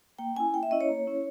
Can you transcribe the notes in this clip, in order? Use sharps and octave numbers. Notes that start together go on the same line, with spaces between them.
A#3 G5
C#4 E4 G#5
A#3 G5
E5
C#4 E4 D#5
C#5
A#3
C#4 E4